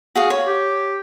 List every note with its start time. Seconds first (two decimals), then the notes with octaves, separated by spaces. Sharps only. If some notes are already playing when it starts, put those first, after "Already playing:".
0.15 F#4 G#4 F5
0.30 C#5
0.47 G4